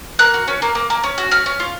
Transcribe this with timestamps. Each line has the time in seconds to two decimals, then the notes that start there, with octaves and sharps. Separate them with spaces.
0.19 A#3 F#6
0.34 F#4
0.48 C#4
0.62 A#3
0.75 A#3
0.90 A#3
1.04 C#4
1.18 F#4
1.31 C#4 F6
1.46 C#4
1.60 F4